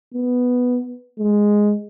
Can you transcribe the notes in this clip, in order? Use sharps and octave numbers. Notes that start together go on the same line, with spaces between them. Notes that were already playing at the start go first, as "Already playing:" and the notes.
B3
G#3